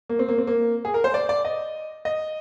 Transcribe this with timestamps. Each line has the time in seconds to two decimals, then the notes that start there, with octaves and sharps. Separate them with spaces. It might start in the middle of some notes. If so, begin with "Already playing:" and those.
0.09 A#3
0.19 C4
0.29 A#3
0.38 C4
0.47 A#3
0.85 G#4
0.94 A#4
1.04 C5
1.14 D5
1.29 D5
1.45 D#5
2.05 D#5